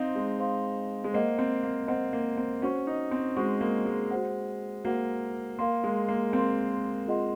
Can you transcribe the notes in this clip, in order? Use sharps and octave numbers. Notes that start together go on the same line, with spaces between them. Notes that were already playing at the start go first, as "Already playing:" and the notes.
Already playing: C4 D#4 C5 F5 C6
G#3
C5 F5 C6
G#3
A#3 C5 D#5 F#5
C4
A#3
C4 C5 D#5 F#5
A#3
C4
C#4 F#4 C5 F#5 C#6
D#4
C4
G#3 F#4 C5 F#5 C#6
A#3
G#3
F#4 C5 F#5
A#3 F#4 C5 F#5
A#3 A#4 F5 C6
G#3
A#3
C4 A#4 F5 C6
F4 G#4 D#5 F#5 C6